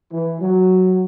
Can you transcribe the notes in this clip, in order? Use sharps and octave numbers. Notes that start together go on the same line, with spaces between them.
E3
F#3